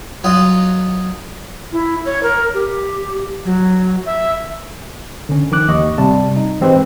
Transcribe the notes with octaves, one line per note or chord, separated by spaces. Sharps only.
F#3 F4 D#5
E4
C#5
A#4
G4
F#3
E5
D3 C#4
D#3 F3 D6 F#6
D#2 D#5 C#6
C3 G3 A5
D#4
E3 G#3 C4 G4 B4 C5